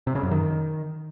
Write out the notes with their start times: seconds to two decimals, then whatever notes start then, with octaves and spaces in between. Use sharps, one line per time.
0.07 C3
0.15 C#3
0.23 F#2
0.31 D#3